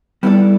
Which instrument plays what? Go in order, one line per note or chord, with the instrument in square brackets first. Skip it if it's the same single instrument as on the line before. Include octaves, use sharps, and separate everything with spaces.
[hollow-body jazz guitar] G3 B3 E4 A4 D5